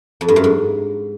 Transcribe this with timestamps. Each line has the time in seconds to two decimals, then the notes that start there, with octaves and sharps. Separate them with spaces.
0.21 F2
0.28 G2
0.36 F#2
0.44 G#2